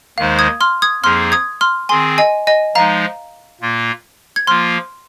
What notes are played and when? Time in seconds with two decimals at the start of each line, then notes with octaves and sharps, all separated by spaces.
0.18 D#2 D#3 G#3 D#4 C5 F5
0.39 D#6 G#6
0.61 C6 F6
0.82 D#6 G#6
1.03 F2 F3 A#3 D#4 G#4 C6 F6
1.32 D#6 G#6
1.61 C6 F6
1.89 D#3 C4 G#4 G#5 C6
2.18 D#5 G#5
2.47 D#5 G#5
2.75 F3 G#3 D#4 F5 A#5
3.61 A#2 A#3 F4
4.36 G#6
4.47 F3 A#3 F4 C6 F6